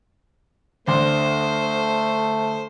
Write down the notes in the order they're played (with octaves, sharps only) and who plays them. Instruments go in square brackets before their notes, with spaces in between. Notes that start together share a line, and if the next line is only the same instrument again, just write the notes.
[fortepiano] D2 D4 C6 [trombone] A3 [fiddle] C5